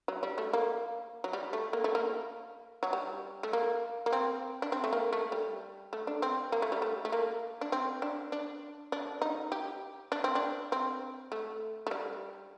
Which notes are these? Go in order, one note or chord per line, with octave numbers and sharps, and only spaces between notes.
F#3
G3
A3
A#3
F#3
G3
A3
A#3
A3
A#3
F#3
G3
A3
A#3
A#3
C4
D4
C4
A3
A#3
A3
G3
A3
D4
C4
A#3
A3
G3
A3
A3
A#3
D4
C4
D4
D4
D4
D#4
G4
D4
C4
D4
C4
A3
A3
G3